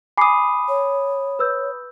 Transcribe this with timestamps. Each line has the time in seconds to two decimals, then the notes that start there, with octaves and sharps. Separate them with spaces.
0.18 G#5 B5 D6 D#6 C7
0.69 C#5
1.39 B4 E6 G6